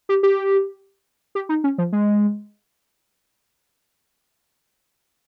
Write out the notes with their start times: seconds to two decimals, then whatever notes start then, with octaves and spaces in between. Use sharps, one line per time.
0.09 G4
0.23 G4
1.35 G4
1.49 D#4
1.64 C#4
1.78 F3
1.92 G#3